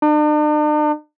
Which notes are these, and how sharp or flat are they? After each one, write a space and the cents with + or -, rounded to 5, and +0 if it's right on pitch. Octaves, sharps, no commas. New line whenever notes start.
D4 +45